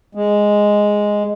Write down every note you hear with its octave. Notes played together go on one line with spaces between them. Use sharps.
G#3